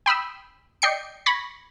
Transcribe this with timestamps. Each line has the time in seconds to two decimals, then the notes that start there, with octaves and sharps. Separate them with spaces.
0.06 G5 B5 D#6 E6
0.82 D5 D#5 G5 C7 C#7
1.26 B5 C#6 G#6 A#6